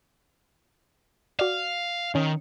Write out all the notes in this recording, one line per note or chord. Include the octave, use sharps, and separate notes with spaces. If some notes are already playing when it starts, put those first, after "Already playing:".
F#4 D5 F5
D#3 C#4